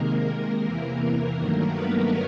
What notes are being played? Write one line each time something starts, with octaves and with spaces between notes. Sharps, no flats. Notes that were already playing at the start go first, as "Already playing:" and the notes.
Already playing: C3 D#3 G#3 A#3 A#4
A#3 A#4
E2 C3 E3 A#3 A#4
G2 D#3 F#3 A3 A#3 A#4
B3 B4